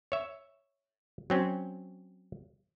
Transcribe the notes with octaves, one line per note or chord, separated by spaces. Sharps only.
C#5 E5
F#3 C4 C#4